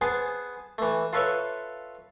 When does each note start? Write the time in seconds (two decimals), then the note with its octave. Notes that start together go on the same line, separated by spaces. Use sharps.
0.01 B3 G#4 C5 G#5 A5
0.78 E3 A3
1.13 F4 A4 B4 C#5 E5